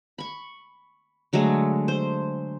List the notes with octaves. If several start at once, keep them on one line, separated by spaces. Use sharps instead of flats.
B5 C#6
D3 F#3 G#3 A3
C5